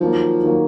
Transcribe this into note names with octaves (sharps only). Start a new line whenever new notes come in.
D#3 F3 F#3 A#3
D#3 F#3 A#3